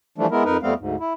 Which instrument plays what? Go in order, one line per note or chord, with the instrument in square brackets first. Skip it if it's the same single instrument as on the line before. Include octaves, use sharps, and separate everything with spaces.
[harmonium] E3 F3 G3 A3 D4
G#3 B3 E4 A#4
F2 D#4 A#4 B4
F2 G3 A3 B3 C4 F5
D2 G#2
E4